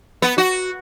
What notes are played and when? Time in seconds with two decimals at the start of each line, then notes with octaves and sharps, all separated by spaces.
0.22 B3
0.38 F#4